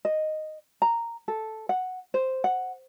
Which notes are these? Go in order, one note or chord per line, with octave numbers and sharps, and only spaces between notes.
D#5
A#5
A4
F#5
C5
F#5